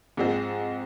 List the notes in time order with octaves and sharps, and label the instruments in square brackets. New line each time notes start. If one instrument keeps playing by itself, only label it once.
[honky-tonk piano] G#2 F3 G#3 C4